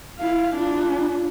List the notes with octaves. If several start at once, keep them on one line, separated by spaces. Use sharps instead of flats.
E4 F5
D4 F4